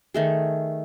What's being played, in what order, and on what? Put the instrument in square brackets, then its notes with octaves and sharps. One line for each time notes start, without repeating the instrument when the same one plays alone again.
[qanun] D#3 A3 G#4